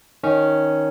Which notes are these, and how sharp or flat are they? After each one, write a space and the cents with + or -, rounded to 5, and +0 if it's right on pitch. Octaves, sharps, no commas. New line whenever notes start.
D#3 +0 C#4 +0